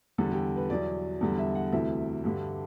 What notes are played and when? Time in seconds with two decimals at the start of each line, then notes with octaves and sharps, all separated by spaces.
0.18 E2 D3 G3 A4
0.32 G4
0.56 B4
0.69 E2 B2 F#3 D5
1.21 E2 D3 G3
1.38 E5
1.55 F#5
1.72 D2 C3 E3 A3 E5
2.24 G2 D3 G3